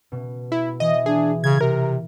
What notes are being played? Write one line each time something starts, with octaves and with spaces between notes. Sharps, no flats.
B2
E4
E3 D#5
D4 G#4
C#3 G#6
C3 A#4